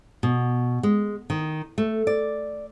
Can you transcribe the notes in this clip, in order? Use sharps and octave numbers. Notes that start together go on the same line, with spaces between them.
B2
G#3
D#3
A3
D5